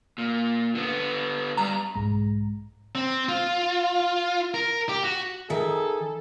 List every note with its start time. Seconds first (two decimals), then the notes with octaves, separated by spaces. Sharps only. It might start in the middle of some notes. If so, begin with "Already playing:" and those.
0.18 A#2
0.75 D3 B3
1.57 G2 G3 A#5
1.95 B1 G#2 G#3 A#5
2.95 C4
3.29 F4
4.54 A#4
4.89 G4
5.04 F#4
5.50 D#3 G#4 A4 E5